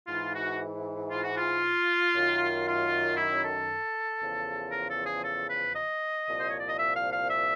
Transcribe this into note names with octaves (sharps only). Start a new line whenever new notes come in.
G#2 E3 F4
F#4
F4
F#4
F4
F#2 D#3
F4
E4
A4
E2 C#3 F3
A#4
A4
G#4
A4
B4
D#5
C2 A#2 F3
C5
C#5
D5
D#5
E5
F5
F5
E5